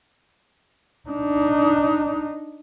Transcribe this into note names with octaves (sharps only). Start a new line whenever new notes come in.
D4 D#4